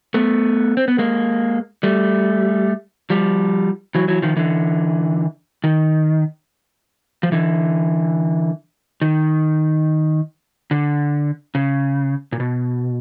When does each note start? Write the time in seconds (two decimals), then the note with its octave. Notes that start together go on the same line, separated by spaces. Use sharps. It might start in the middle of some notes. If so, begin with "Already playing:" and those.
0.14 A3 B3
0.77 C4
0.88 B3
0.98 G#3 A#3
1.83 G3 A3
3.10 F3 G3
3.95 E3 F#3
4.08 E3 F#3
4.22 D#3 F3
4.36 D3 E3
5.64 D#3
7.23 F3
7.32 D3 E3
9.01 D#3
10.71 D3
11.55 C#3
12.32 A#2
12.40 B2